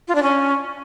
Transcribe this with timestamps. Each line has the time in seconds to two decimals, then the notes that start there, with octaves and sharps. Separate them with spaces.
0.08 F4
0.15 D4
0.22 C#4